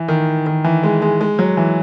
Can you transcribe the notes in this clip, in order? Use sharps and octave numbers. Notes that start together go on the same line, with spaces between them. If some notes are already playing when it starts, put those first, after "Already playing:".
Already playing: E3
D#3
D#3
E3
G#3
G#3
G#3
F#3
E3